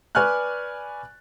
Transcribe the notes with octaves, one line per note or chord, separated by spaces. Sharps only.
B4 D5 G#5 C#6 F6 F#6